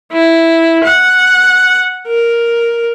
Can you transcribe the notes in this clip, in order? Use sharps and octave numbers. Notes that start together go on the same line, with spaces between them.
E4
F#5
A#4